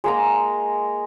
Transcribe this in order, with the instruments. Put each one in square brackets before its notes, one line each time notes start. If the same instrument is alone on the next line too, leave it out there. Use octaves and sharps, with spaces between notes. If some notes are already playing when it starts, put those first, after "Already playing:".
[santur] G#3 A#3 A#5